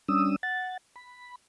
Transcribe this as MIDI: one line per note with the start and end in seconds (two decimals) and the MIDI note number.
0.08 0.36 55
0.08 0.36 61
0.08 0.36 62
0.08 0.36 87
0.08 0.36 88
0.43 0.77 78
0.43 0.77 93
0.96 1.35 83